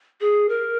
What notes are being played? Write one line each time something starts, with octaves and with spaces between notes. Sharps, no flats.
G#4
A#4